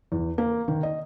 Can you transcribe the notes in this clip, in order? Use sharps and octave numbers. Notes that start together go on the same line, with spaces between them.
E2
A#3
D#3
D#5